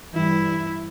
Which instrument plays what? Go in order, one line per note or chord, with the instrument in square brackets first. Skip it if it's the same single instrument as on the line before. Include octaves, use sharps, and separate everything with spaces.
[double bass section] G2 E3 G3 [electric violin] E4